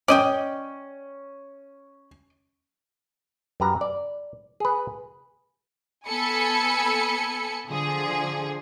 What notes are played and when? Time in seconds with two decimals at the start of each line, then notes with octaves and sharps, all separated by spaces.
0.08 C#4 D5 D#5 G5
3.60 F#2 G4 B4 A#5
3.81 D5
4.60 G#4 B4
6.08 B3 A4 G#5 B5 C#7
7.68 D3 F3 G#4